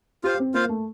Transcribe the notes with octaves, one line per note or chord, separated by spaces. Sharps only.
F4 G4 C5 F5
C4
A#3 F4 C5 F5
A3